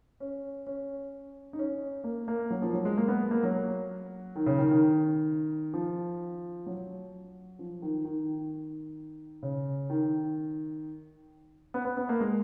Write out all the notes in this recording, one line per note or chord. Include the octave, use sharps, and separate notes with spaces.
C#4
C#4
D#4
C#4
A#3
A#3
F#3
F3
F#3
G#3
A#3
B3
A#3
F#3
D#3
C#3
D#3
D#3
F3
F#3
F3
D#3
D#3
C#3
D#3
B3
B3
B3
A#3
G#3